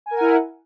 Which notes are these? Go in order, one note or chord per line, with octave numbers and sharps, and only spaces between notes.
E4 A#4 F#5 G#5